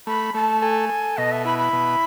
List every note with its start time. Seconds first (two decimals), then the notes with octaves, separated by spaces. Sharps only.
0.07 A3 B5
0.34 A3 A5
0.62 A4 G#5
0.89 A4
1.18 B2 D#5
1.32 E5
1.45 E4 B5
1.58 B5
1.73 B2